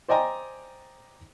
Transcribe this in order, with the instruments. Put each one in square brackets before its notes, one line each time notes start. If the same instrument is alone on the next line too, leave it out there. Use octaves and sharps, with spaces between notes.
[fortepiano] C5 D5 D#5 G5 G#5 A#5